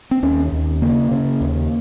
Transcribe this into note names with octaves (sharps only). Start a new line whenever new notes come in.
C4
D#2 C#4
D#2
C#3 A#3
C#3
D#2